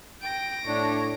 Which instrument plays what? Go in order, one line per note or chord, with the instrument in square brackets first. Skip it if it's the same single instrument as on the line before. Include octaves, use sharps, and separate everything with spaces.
[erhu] G5 [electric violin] A#6 D7
[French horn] A2 [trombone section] D4 [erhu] C#5